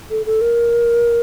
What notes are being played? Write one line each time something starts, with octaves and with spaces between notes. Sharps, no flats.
A4
A4
A#4